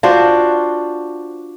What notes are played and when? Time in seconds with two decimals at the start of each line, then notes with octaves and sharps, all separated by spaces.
0.03 D4 F4 F#4 C5